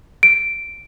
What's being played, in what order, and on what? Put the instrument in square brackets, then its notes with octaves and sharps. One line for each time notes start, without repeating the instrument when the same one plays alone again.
[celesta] D7